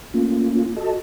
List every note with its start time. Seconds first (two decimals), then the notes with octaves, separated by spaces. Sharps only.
0.14 A3 A#3 C#4 F4
0.76 F#4 A4 D#5 A5